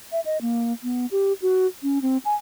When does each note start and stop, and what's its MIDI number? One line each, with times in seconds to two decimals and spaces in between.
0.12 0.20 76
0.26 0.40 75
0.41 0.73 58
0.83 1.06 59
1.11 1.33 67
1.42 1.67 66
1.83 2.02 61
2.02 2.18 60
2.25 2.35 80